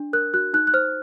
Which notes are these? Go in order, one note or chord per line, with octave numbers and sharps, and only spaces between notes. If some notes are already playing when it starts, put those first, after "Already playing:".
Already playing: D4
A#4 F#6
F#4 F#6
D#4 F#6
F#6
C5 F6